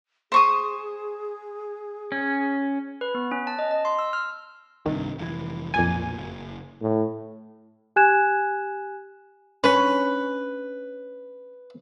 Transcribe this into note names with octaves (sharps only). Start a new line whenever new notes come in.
G#4 C5 C#6 D#6
C#4
B4
B3
C#4
A5
D#5
D#5
C6
E6
F6
C2 G2 C3 D#3
F1 G#2 E3
B1 F2 A#2 G#5
F#1
A2
G4 G#5 F#6 G#6 E7
C#4 B4